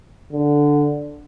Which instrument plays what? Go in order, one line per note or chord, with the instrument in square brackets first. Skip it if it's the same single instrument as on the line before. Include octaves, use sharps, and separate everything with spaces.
[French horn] D3